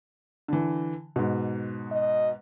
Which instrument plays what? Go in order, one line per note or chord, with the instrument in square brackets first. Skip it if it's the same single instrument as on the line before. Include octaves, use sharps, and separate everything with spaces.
[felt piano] D3 E3
G#2 B2
[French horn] D#5